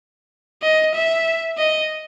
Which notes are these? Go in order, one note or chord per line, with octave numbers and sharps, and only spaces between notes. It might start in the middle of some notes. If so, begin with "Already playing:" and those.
D#5
E5
D#5